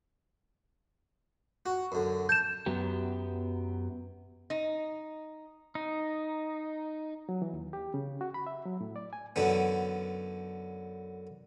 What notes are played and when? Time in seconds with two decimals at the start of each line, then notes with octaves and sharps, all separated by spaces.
1.66 F#4
1.92 F#2 D3
2.29 A5 G6 E7
2.66 F#2 F#3 B3 G4
4.50 D#4
5.75 D#4
7.29 F#3
7.42 E3
7.53 D#2
7.73 G4
7.94 C#3
8.21 F#4
8.34 B5
8.46 E5
8.65 F#3
8.81 A2
8.96 D5
9.13 G#5
9.36 F#2 D3 B3